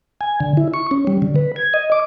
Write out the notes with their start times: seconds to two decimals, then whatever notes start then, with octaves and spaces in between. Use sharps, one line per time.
0.21 G#5
0.40 D3
0.57 E4
0.74 C#6
0.91 C#4
1.07 G3
1.22 D3
1.36 B4
1.56 G#6
1.74 D#5
1.92 D6